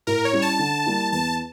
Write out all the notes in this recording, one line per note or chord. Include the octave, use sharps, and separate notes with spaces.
A2 A#4
C#5
G3 C#4 E4
A5
D3
G3 A#3 E4
E2 A5